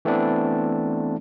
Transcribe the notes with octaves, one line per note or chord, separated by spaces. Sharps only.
E3 A3 B3 C4 D4 E4